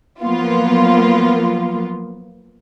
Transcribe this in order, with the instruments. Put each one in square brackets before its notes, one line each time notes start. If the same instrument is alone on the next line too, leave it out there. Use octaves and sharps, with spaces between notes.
[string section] F3 F#3 A#3 B3 F4